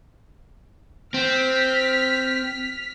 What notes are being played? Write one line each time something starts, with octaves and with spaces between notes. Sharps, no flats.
C4 F6 B6